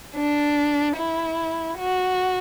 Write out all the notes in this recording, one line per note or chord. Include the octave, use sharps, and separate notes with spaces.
D4
E4
F#4